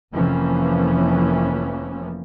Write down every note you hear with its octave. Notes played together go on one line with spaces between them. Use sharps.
F1 F2 E3 F3 A#3 C#4